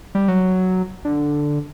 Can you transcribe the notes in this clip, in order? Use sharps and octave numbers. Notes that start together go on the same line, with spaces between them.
G3
F#3
D3